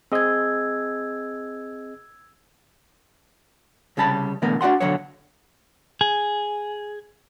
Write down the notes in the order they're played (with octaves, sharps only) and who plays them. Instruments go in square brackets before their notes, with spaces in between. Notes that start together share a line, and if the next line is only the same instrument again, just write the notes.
[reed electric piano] C4 G#4 D#5 [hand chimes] E6 G#6
[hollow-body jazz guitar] C2 C#3 G3 A5 B5
B2 D3 E3 A3 B3 A#4
D4 F#4 D5 F#5 C6
B1 E2 D3 F#3 C#5
[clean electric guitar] G#4